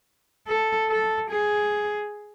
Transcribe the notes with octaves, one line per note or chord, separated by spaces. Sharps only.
A4
A4
G#4